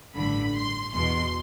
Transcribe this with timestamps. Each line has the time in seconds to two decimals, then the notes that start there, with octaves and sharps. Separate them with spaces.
0.16 A1 G2 D3 B5
0.54 C6
0.91 E2 B2 C6